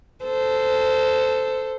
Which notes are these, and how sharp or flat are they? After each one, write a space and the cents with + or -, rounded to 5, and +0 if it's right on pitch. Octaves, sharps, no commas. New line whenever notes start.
A4 +0 C5 -15